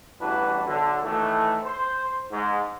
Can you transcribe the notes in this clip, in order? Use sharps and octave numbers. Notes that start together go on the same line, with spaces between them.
A1 G2 E3 D4 F#4 B4
B1 D3
A2 D#3 E3 A3
C5
G#2